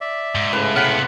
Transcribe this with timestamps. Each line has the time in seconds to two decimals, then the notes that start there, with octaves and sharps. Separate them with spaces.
0.01 D5 E5
0.35 G#2
0.53 A2 C#3 B4
0.76 C3 B3 F5 F#5 B5